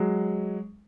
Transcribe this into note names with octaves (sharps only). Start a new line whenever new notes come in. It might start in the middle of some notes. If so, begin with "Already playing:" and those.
Already playing: F#3 G#3